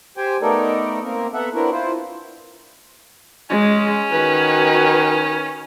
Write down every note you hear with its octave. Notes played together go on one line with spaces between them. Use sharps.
G4 C5 G5 G#5
A3 B3 D#4 A4 A#4 D5
A#3 C4 A#4
B3 A4 E5 F#5
B3 C4 D4 E4 F#4 A#4
E4 F4 C5
G#3 C#4
D#3 F#4 B4